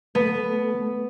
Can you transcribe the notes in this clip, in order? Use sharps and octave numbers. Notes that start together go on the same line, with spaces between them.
A3 B3